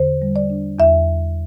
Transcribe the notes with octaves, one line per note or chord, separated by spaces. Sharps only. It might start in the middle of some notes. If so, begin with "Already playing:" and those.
Already playing: E2 D3 C5
G3
D5
D4
E2 E5